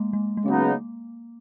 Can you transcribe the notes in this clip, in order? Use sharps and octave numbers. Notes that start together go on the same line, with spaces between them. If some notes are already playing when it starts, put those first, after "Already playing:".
Already playing: G#3 A#3
G#3
G#3
C#3 F#3 A#3 B3 D#4